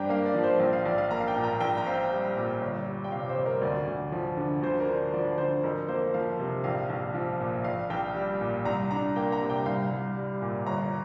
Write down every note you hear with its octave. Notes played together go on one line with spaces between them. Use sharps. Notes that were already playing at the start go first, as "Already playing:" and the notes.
Already playing: G2 D4 C5 G5 A#5
A#3 F5
D5
F3
C5
A#1 D5
F5
A#1 D5
F5
A#3 A#5
F5
G5
A#2
A#5
A#1 G5
A#5
C4 F5
G5
G3
A#2
G1
G3
G5
C3 F5
C5
F2
A#4
D2 D5
D2
F3
D3
D2 C5
A#4
D4
F3 D5
D3 C5
F2 A#4
A#3 C5
F3 F5
C3
A#1 F5
A#1
F3
A#2
A#1 F5
A#1 G5
G3
A#2
C2 A#5
D4 A#5
A#3 G5
A#5
C3
G5
C2 F5
C2
G3
A#2
G1 A#5